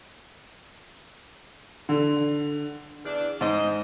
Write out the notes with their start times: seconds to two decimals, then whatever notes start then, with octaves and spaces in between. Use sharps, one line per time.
1.89 D3
3.04 E2 D4
3.41 G#2 C5 D#5